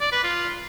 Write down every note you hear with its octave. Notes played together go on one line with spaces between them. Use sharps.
D5
B4
F4